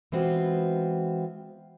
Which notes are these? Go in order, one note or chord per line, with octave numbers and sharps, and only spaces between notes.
E3 G#3 B3 C4 F4 F#4